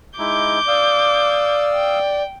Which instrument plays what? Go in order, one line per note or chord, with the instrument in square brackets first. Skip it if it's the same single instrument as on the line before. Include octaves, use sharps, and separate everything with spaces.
[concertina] G#3 D#4 E4 [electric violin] D6 G6
[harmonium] D5 [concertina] F5 D#6 E6
[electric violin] G5